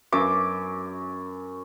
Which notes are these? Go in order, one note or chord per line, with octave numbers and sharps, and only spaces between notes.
F#2 D6